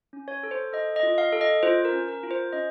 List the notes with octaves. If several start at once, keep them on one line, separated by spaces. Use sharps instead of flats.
C#4
C#5
A4
C5
A4 D#5
D#5
F4
F5
A4
D#5
F4 C5
A#4
C#4
A#4
F4
C5
C#4 D#5